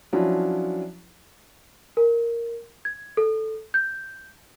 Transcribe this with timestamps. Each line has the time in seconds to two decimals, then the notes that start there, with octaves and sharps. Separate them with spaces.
0.13 F3 F#3 C#4 D4 E4 F4
1.97 A#4
2.85 G#6
3.17 A4
3.74 G6